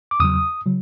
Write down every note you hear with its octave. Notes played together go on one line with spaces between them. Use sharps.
D6
E2 C#3 F#3 D#6
C#3 F#3